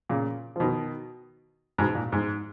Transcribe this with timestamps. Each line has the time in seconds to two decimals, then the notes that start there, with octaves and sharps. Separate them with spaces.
0.09 A#2 C#3
0.56 F3
0.60 B2 D#3
1.78 G#2 B2
1.95 A#2
2.12 G#2